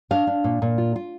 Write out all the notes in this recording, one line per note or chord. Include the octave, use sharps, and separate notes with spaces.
D4 F5
D4
A#2
A#2
F4
F4